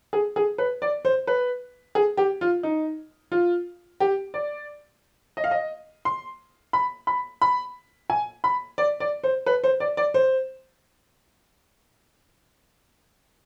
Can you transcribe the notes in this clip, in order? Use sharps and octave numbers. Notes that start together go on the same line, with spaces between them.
G#4
G#4
B4
D5
C5
B4
G#4
G4
F4
D#4
F4
G4
D5
D#5
F5
D#5
C6
B5
B5
B5
G#5
B5
D5
D5
C5
B4
C5
D5
D5
C5